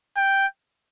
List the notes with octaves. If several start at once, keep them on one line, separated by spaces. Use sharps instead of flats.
G5